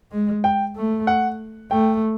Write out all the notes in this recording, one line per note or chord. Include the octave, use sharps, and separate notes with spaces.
G#3
G5
A3
F#5
A3 G5